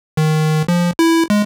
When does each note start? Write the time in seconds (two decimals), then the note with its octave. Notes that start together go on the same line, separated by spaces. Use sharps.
0.17 D#3
0.68 F3
0.99 E4
1.30 G#3